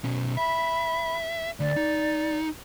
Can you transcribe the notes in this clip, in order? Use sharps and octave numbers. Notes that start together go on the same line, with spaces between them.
B2 C#4
E5 B5
D2 D5
D#4